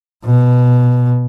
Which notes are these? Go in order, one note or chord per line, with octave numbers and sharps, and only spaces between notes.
B2